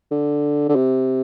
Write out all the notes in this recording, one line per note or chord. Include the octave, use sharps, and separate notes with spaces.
D3
D3
C3